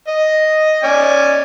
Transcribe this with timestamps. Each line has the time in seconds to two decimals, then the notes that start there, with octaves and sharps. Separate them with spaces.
0.08 D#5
0.83 C#4 D5 G#5